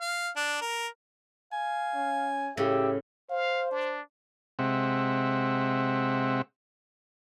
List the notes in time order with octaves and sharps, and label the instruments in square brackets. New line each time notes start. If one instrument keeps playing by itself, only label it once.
[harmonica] F5
D4
A#4
[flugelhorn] F5 [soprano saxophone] G#5
[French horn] C#4
[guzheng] A2 C#3 [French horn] G4 [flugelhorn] E5
[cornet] C5 [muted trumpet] F5
[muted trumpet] D4
[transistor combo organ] C3 G#3 C4 E5 F#5